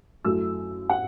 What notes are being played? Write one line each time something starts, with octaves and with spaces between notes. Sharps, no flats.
F#2 F#3 A3 E4 E6
F#5